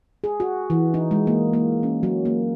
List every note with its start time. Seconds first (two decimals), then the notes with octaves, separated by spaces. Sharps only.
0.24 G#4
0.40 F#4
0.70 E3
0.94 D#4
1.11 G#3
1.27 A#3
1.53 A#3
1.83 C#4
2.03 F#3
2.25 A#3